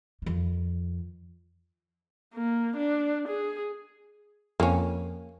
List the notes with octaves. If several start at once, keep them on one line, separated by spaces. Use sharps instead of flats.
F2 D#3
A#3
D4
G#4
F2 A#3 C#4